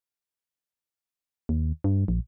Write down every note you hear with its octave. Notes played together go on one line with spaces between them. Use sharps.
D#2
G2
A#1